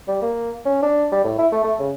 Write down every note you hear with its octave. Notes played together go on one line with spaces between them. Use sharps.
G3
A#3
C#4
D4
G3
A2
E4
A3
A3
C#3